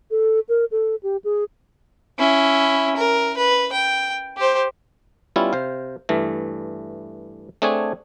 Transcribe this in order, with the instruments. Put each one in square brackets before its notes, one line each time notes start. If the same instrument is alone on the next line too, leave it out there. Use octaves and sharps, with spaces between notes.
[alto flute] A4
A#4
A4
G4
G#4
[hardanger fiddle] C#4 E4
A#4
B4
G5
G4 C5
[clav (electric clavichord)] G3 B3 C#4 E4 F4
C3 C5 F5
G2 E3 A3
A3 C4 D4 G#4 C#5 G#5